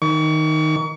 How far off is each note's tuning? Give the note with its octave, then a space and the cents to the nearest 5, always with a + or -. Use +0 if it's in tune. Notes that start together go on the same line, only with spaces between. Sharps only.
D#3 +0 C#6 +35